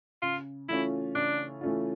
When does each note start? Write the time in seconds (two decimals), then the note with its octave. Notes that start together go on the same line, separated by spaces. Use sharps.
0.22 C#3 F4
0.69 E3 A3 C#4 E4 F4
1.15 C#3 D4
1.61 E3 A3 C#4 F4